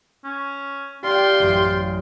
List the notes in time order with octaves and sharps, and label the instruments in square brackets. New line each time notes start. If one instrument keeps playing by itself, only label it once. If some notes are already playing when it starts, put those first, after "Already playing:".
[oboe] C#4
[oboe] F4 [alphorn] G4 [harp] D5 F5 [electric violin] G5 C6
[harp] A1 F#2